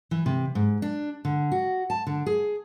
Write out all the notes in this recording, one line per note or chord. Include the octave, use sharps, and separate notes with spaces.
E3
C3
G#2
D4
D3
F#4
A5
D3
G#4